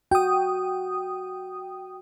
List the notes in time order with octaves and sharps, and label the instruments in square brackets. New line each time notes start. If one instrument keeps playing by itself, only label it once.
[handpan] F#4 [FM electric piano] G5 D#6